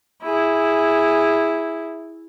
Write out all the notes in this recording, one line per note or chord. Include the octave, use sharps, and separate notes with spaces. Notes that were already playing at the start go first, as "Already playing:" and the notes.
E4 G#4